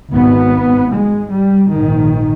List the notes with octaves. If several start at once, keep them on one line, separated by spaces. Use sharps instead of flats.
G#1 G#2 B3
G#3
G3
A#1 G#2 D#3